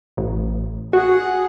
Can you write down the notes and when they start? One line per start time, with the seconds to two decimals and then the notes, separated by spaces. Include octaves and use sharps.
0.17 A1
0.93 F#4 G#4 F#5